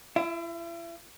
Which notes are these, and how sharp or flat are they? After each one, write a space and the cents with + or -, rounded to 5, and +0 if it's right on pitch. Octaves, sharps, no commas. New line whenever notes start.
E4 +40 E5 -5